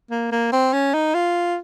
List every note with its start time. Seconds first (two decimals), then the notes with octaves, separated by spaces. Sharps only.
0.11 A#3
0.32 A#3
0.53 C4
0.73 C#4
0.94 D#4
1.14 F4